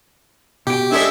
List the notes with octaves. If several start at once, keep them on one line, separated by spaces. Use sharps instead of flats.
B2 G4 G5
G#3 D4 A4 D5 E5